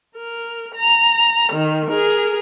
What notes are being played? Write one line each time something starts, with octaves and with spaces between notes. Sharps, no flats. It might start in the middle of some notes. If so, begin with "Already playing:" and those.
A#4
A#5
D#3
G#4 A#4